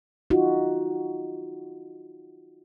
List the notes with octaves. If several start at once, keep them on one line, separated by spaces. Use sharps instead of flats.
D#4 F4 F#4